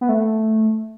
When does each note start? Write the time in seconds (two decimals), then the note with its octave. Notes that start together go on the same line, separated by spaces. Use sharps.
0.01 B3
0.09 A3